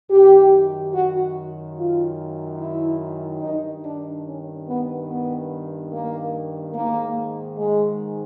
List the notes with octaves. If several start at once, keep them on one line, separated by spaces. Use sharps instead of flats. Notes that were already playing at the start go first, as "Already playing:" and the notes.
F#2 D#3 G4
F#4
F4
E4
G2 D#3 D#4
D4
C#4
B3
B3
A#3
G#2 D#3 A#3
G#3